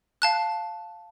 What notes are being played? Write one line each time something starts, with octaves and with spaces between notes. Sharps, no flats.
F5 A5 F#6